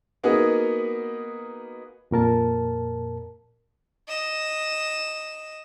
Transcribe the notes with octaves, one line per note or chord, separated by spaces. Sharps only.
A#3 B3 D#4 F#4 G#4
F2 A#2 A#4 A5
D#5 E7